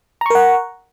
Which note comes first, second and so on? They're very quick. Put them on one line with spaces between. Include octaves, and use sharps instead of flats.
A#5 C#6 A#4 F#5